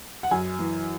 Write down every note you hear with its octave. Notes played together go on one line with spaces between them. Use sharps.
F#5
F#2 G#5
E3